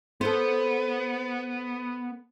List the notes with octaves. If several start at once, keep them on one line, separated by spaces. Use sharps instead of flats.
B3 A4 C5